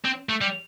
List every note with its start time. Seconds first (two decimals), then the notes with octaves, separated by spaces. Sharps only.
0.04 C4
0.29 A3
0.41 G3